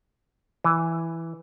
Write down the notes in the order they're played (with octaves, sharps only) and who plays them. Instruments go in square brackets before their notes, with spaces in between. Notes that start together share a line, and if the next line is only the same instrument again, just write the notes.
[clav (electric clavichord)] E3